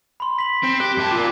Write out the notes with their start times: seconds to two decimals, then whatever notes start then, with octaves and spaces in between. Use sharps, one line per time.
0.20 B5 C6
0.39 B6 F#7
0.63 C4
0.80 G4 F#6
0.97 F#2 A5
1.11 F4 A#4 D6